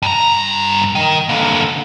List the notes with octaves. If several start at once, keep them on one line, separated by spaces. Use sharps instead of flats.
G2 A#5
D#3
D3 A#3